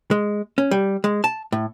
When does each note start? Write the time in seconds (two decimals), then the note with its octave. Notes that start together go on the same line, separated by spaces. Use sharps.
0.11 G#3
0.58 C#4
0.71 G3
1.04 G#3
1.24 A5
1.52 A2